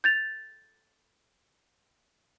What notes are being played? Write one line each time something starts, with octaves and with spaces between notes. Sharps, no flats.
G6 A6 F7